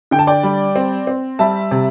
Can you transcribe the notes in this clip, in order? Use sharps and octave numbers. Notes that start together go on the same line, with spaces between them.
D3 G5
A5
D5 G5
G3
C4
C4
G3 E5 A5
C3